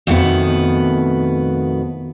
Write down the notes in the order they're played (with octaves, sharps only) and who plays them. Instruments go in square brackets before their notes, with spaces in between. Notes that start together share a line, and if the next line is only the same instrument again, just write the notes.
[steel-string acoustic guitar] F2 B2 D#3 A3 B3